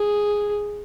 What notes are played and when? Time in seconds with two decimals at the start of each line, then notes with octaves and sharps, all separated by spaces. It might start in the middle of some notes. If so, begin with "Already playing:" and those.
Already playing: G#4